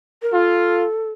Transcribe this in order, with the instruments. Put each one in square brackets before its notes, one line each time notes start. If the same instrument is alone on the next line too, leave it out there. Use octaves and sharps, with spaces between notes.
[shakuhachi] A#4
[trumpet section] F4 [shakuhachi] A4